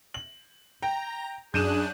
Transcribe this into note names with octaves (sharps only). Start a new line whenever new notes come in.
F#7
G5 A#5
F#2 D4 G#4 F#6 G6 D#7 E7